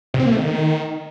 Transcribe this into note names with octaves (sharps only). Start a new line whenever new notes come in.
C3
C4
A#3
A3
D#3